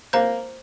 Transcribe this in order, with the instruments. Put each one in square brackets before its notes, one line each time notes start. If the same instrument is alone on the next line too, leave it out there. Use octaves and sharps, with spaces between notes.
[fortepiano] A#3 [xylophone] C5 A#5 G6